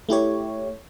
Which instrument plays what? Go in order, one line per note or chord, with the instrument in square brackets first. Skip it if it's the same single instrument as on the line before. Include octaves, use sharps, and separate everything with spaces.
[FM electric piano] A3 E4 G4 C#5